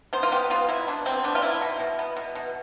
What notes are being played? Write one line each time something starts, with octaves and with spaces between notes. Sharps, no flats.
B3 C5
F4
B3 G4
B3 F4
B2 E4
B3 D4
B2 C4
B3 D4
F4
B3 E4
B2
B2
B3
B2
B2